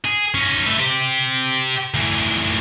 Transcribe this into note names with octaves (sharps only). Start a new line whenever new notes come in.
G#4
C#4 D#4
A3 B3
G4 C5
D2 E3